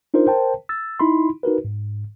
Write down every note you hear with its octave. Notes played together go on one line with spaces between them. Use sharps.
D4 D#4 F4 A#4 C5
A#4 C5 G5 A5
E6 A6
D#4 E4 B5 C6
D#4 F#4 A#4 B4
G#2